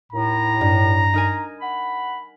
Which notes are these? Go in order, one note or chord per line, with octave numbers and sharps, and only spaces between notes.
D#2 A2 A#5
G2
D#4 A#4 G#5
F#5 B5